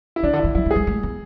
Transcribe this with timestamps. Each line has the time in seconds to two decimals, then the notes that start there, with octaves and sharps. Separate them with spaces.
0.16 E4
0.23 C#3 D4
0.33 D3
0.39 E3 E4
0.55 F#3 E4
0.66 A3
0.71 G#4
0.76 G#3
0.87 A3
1.03 B3